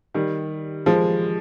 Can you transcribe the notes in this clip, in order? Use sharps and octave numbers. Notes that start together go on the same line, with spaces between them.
D#3 G3
F3 G#3